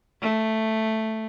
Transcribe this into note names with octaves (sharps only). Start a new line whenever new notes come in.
A3